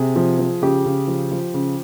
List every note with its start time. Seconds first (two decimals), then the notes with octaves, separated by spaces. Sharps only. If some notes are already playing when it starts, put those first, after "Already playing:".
Already playing: C3 G#4
0.16 F3
0.39 F3
0.62 C#3 G4
0.86 C#3
1.08 F3
1.31 F3
1.54 C#3